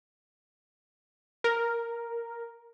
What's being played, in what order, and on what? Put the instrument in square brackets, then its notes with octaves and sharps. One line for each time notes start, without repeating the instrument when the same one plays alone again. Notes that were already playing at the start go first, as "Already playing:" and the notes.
[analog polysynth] A#4